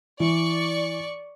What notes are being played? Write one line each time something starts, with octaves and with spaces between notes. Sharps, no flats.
E3 D5 C#6